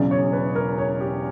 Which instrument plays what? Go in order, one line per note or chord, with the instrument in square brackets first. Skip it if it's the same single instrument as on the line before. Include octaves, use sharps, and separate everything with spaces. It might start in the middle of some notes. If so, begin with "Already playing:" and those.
Already playing: [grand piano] E1 E2 C#3 F#3 D5
C#5
B4
A#4
C#5
G4